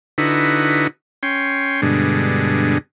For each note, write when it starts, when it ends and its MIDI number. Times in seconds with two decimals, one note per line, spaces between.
0.18 0.87 50
0.18 0.87 63
0.18 0.87 64
0.18 0.87 66
0.18 0.87 71
1.23 1.81 61
1.23 1.81 79
1.23 1.81 84
1.82 2.78 43
1.82 2.78 47
1.82 2.78 50
1.82 2.78 56